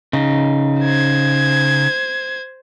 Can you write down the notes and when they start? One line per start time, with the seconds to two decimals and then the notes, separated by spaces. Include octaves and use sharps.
0.13 C#3 D#4
0.81 C5 G#6